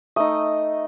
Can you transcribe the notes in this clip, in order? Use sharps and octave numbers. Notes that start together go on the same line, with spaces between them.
A3 D#4 D#6